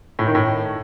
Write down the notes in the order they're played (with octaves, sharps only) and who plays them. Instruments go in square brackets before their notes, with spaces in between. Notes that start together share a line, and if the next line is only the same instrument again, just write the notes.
[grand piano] A2
D#3
A2